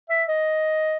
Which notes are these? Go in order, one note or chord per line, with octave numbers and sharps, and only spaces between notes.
E5
D#5